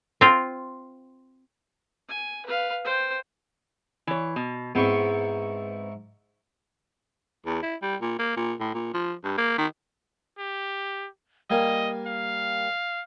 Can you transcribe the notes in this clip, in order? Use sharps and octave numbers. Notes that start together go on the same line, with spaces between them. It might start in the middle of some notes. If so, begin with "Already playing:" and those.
C4 F4
G#5
B4 F5
C5 G5
E3 C#5
B2
G#2 B3 C4 E4 C#6
E2
E4
G3
A#2
A#3
A#2
A2
A#2
F3
G2
A#3
D#3
G4
G3 A#3 D#5 G#5
F5